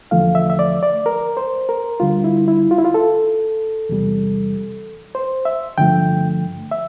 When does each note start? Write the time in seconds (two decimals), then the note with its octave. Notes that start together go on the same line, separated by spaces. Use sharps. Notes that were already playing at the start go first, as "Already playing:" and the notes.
0.11 E2 D3 F3 A3 F5
0.35 E5
0.50 E5
0.59 D5
0.83 D5
1.06 A#4
1.37 C5
1.69 A#4
2.00 D2 D3 G3 F4
2.24 E4
2.48 E4
2.71 F4
2.78 E4
2.85 F4
2.94 A4
3.89 E2 C3 G3
5.15 C5
5.45 E5
5.77 G2 D3 F3 A3 G5
6.71 E5